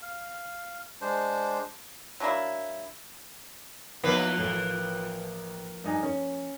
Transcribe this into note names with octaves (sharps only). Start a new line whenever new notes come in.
F5
G#3 D4 C5
F#3 A#3 D4 E4
F3 A#3 B3 D#4 E4 B4
A1 A4
G2 D#4 G#5
C#4